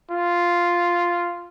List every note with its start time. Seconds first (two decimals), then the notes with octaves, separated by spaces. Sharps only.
0.11 F4